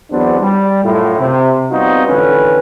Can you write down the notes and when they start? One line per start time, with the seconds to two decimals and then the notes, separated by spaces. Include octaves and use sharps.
0.11 E2 F#3 B3 C4 D4
0.40 G3
0.83 F#2 A2 F4
1.19 C3
1.71 G3 B3 C4 D#4 F4 F#4
2.07 A1 F2 D3 C#4 B4